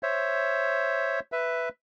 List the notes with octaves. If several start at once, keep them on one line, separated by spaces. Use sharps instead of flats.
C5 C#5 E5
B4 E5